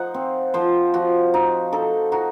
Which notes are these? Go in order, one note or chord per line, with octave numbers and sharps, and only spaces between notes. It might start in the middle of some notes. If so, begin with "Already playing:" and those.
Already playing: F3 D#4 F#5
C4
F3 C5
F3 F#4
D#4
D#4 A4
D#4 F#4